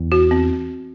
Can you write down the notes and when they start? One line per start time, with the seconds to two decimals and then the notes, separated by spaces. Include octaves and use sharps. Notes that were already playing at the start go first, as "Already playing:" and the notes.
Already playing: E2
0.12 F#4
0.31 C4